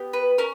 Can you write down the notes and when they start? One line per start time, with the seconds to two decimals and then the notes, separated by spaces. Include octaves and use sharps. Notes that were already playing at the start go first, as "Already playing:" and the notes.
Already playing: B3 G4
0.13 B4
0.38 C#4 A#4